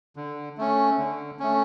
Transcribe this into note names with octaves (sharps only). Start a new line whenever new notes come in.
D3
A3 C#4
D3
A3 C#4